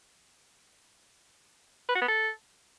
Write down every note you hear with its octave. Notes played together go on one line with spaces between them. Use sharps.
B4
F#4
B3
A4